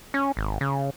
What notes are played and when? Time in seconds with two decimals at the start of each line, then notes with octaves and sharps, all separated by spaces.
0.14 C#4
0.37 G#1
0.61 C#3